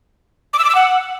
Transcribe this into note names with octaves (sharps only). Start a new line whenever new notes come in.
D6
E6
D6
E6
F#5